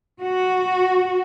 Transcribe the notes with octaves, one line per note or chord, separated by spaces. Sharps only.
F#4